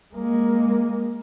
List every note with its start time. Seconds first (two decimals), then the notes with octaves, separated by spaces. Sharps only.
0.15 G#3 A#3